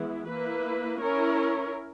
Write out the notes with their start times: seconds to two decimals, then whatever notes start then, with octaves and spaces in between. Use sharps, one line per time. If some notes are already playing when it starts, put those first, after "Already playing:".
Already playing: E3 G#3 B3 E4
0.29 A#3 E4 B4
0.98 C#4 E4 A#4 C#5